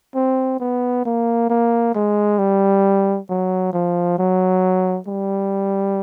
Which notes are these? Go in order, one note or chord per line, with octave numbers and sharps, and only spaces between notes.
C4
B3
A#3
A#3
G#3
G3
F#3
F3
F#3
G3